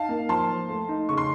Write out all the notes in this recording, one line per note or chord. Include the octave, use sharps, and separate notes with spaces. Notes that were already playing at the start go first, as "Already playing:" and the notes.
Already playing: D#4 F5 A5
A#3
F3 A5 C6
F3
A3
D#4
C#3 C#6
C6